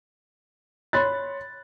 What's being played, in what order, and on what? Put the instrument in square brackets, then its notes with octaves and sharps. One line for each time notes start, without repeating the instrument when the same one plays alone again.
[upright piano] C#5 B5 C6 F#6 A6